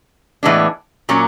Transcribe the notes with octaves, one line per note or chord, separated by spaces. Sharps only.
A2 E3 G#3 B3 D4
A#2 F#3 A#3 C#4